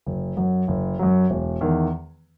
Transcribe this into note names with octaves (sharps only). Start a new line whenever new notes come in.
F#1
F#2 F#3
F#1
F#2 F#3
E1
E2 D#3